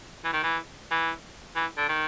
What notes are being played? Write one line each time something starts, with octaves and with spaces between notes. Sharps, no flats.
E3
D#3
E3
E3
E3
D3
D#3